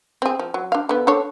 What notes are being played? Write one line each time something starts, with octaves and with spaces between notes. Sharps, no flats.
C4 G#4
F3
F#3
D4 F5
D3 B3
D4 A4 C#5